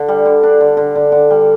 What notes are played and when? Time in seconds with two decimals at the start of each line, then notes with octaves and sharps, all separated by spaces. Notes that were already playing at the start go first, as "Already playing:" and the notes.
Already playing: D3
0.08 G3
0.25 D3
0.43 D4
0.61 D3
0.77 D3
0.95 D3
1.12 D3
1.30 G3